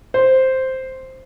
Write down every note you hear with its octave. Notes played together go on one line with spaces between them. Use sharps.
C5